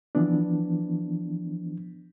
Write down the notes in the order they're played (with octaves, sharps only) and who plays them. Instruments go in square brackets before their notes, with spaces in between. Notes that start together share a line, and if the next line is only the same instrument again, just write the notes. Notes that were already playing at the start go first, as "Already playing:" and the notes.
[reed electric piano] E3 F3 B3 D4